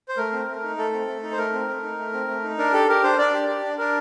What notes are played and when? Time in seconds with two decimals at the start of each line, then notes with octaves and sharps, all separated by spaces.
0.08 C5
0.17 A3 A#4
0.32 C4
0.48 A3
0.63 D#4
0.78 A3 A4
0.93 C4
1.08 A3
1.23 D#4
1.32 C5
1.38 A3 A#4
1.53 C4
1.68 A3
1.83 D#4
1.98 A3
2.13 C4
2.28 A3
2.44 D#4
2.58 D4 A#4
2.73 G4 A4
2.88 G4 A#4
3.03 D4 C5
3.18 D4 D5
3.34 G4
3.48 G4
3.63 D4
3.78 D4 A#4